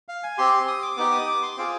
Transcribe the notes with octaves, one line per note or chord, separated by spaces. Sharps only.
F5
G#5
C4 G4 C6
C6
D#6
D6
B3 D#4 G4 D6
D#6
D6
C6
C4 F4 G#4 D6